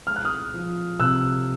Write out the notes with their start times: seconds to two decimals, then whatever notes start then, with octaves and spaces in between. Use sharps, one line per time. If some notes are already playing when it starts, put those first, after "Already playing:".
0.07 G#3 F6
0.16 F#6
0.25 D#6 F6
0.54 F3
1.00 C3 E6 F#6